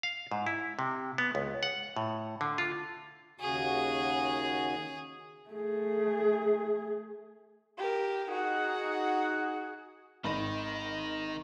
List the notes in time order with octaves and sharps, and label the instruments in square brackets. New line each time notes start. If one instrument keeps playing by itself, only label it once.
[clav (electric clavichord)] F5
G#2
E4
C3
B3
C#2
F#5
A2
D3
F4
[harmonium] D#2 C#3 F#4 [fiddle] G#4
[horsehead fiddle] A3 G#4
[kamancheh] G4 A#4
[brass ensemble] D#4 F#5 [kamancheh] F#4 G#4
[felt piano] G#1 B5 A#6 [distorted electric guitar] D#3 [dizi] D#5